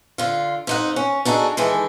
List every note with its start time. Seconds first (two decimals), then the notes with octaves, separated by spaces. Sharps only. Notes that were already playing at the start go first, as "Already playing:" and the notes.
0.18 D3 F4
0.67 F2 D#4 F#5
0.96 C#4
1.25 D4 D#4 F#4 G#4 A4
1.57 D#3 E3 G#3 A4